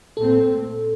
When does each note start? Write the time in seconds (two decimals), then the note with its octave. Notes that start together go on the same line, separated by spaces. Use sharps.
0.17 A#2 A3 C4 A4